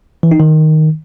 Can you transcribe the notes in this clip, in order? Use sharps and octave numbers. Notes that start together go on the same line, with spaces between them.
E3
D#4
D#3